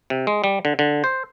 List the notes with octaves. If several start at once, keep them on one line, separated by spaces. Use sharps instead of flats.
C3
G#3
G3
D3
D3
C5